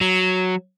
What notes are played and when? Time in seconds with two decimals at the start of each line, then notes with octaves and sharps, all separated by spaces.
0.01 F#3